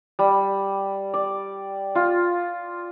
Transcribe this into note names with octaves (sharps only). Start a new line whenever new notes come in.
G3
D5
F4